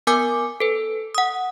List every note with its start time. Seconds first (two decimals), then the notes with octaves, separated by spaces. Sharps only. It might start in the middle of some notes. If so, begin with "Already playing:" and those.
0.07 B3 A#4 G#5 D6 G6
0.60 A4 B4
1.15 F#5 D#6